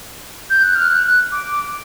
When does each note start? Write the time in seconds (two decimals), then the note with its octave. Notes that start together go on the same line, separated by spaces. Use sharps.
0.50 G6
0.62 F#6
0.75 F6
0.88 F#6
1.31 D6